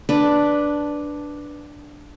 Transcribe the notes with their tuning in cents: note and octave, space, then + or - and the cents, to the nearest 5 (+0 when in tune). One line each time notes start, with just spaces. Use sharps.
D4 +0 B4 +0